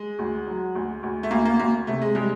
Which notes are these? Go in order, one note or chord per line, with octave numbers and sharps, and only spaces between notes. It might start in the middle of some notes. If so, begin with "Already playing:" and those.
Already playing: G#3
D2
F#3
D2
D2
A3
D2 A#3
A#3
D2 A#3
C3 A3
G#3
G3 G#3